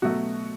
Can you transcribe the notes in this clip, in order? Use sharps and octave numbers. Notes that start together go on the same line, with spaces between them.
B2 F#3 A3 F#4